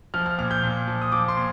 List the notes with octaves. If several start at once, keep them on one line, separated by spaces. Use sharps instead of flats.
F3 F6
F6
A#2 F6
G6
A#2
F3
D#6
F3 D6
C6
A#2